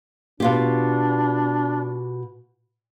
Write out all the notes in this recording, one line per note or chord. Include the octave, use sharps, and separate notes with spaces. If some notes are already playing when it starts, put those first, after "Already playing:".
B2 D4 F4 G4